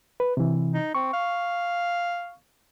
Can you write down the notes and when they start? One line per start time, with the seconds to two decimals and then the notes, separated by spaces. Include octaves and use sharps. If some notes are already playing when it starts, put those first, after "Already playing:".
0.20 B4
0.37 C3 E3
0.74 D#4
0.95 C4 C#6
1.13 F5